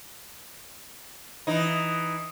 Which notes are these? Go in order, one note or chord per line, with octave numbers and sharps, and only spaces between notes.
E3 D#4